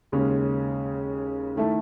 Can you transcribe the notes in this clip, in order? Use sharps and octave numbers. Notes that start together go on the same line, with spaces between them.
D#2 C#3 G#3 C#4 G#4
D#3 A3 E4 A4